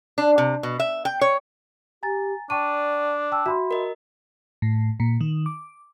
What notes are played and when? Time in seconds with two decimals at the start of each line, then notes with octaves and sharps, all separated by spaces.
0.18 D4
0.38 C3
0.63 B2
0.80 E5
1.05 G5
1.21 C#5
2.03 G4 G#5 A#5 A6
2.50 D4 D5 G5 A5 C#6 D#7
3.32 G5 A5 E6
3.46 F#4 E5 B5 C6
3.71 A#4 D#5
4.62 A2
5.00 A#2
5.21 D#3
5.46 D6